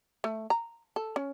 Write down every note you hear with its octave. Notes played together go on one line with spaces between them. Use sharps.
A3
A#5
A4
C#4